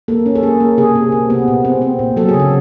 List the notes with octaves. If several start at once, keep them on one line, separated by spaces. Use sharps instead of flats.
A#3 A4
C#4
A4
A#3 G#4
A#3
C3 G#4
C3
C3
B3
A#2
C4
C4
A#2
F#3 A4
G#4
C#3
A4